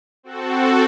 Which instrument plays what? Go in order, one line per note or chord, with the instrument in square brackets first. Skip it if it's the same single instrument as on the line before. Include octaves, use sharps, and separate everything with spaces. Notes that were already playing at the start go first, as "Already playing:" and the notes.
[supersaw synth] C4 F#4 A4